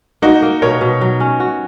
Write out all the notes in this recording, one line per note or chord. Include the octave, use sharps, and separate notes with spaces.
A#3 D#4 F#4
A#3
B2 A#4 C#5
B2
F#3
C#4
F#4